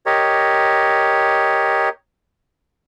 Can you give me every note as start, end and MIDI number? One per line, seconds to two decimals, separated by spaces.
0.06 1.89 67
0.06 1.89 70
0.06 1.89 73
0.06 1.89 75